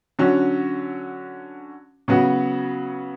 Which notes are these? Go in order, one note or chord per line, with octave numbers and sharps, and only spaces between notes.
D3 F#3 C#4 F#4
C#3 F#3 B3 F#4